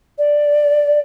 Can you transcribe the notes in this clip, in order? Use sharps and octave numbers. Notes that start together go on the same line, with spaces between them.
D5